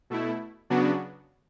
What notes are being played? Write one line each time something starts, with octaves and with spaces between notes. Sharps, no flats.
B2 A3 E4
C#3 F#3 B3 D4 F#4